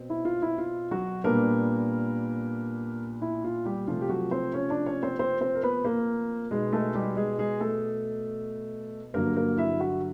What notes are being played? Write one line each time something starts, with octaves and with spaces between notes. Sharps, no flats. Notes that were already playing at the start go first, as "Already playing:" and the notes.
Already playing: B2 C4
E4
F4
E4
F4
F#3 F#4
A#2 G3 A#3 B3 D4 A#4
E4
F4
G3 G4
C3 F3 A3 F4
G4
F#3 F#4
C4 C5
C#4 C#5
D4 D5
C#4 C#5
C4 C5
C4 C5
C4 C5
A#4
B3 B4
A#3 A#4
B2 G#3 B3 D#4 G#4
A3 A4
G3 G4
G#3 G#4
G#3 G#4
A3 A4
G2 D3 F#3 A#3 A#4
A#3 A#4
E4 E5
F#4 F#5